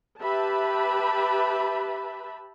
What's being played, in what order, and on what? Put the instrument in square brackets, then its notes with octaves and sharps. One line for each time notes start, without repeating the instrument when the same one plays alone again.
[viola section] G4 B4 E5 A5 B5